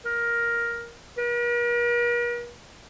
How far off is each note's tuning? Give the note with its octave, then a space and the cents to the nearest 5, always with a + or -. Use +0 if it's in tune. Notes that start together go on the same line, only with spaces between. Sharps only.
A#4 +10
A#4 +45